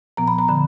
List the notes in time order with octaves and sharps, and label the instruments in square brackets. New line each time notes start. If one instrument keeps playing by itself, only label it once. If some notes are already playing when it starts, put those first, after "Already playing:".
[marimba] A#2 F3 B3 A#5
B5
A#5
D3 F3 B5